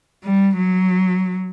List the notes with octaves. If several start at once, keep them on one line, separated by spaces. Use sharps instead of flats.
G3
F#3